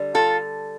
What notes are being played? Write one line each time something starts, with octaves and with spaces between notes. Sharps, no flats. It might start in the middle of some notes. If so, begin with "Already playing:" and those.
Already playing: D3 G3
F4 A4